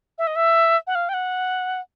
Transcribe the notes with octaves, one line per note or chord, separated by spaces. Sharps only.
E5
D#5
E5
F#5
F5
G5
F#5